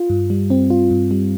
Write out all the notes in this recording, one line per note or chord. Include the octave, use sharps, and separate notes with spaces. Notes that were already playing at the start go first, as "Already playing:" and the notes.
Already playing: F4
G2
G3
C4
F4
G2
G3